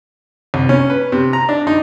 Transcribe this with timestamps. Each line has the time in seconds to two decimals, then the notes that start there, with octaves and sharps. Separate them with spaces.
0.54 C2
0.69 C#4
0.90 B4
1.12 C3
1.33 A#5
1.49 D4
1.67 D#4